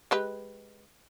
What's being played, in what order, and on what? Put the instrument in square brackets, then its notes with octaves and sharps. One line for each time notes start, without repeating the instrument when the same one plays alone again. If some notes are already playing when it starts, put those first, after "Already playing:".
[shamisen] G#3 G4 B4